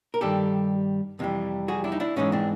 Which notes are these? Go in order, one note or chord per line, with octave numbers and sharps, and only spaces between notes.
A#4
G2 D#3 G3 G4 A4
F2 C3 E3 G3
F#4 G#4
D4 E4
D#4
D4 E4
G#2 E3 G#3 C#4 D#4
C4 D4